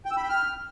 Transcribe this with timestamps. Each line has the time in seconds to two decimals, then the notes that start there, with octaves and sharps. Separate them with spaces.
0.05 G5
0.11 E6
0.17 B5
0.23 G5
0.29 F6